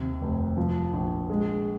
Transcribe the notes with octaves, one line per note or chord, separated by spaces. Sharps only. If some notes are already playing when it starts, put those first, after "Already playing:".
Already playing: D#2 C3
F1
F3
A#1
G#3